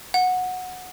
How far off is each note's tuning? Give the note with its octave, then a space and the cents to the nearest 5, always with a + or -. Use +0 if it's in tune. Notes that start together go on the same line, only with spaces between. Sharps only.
F#5 -10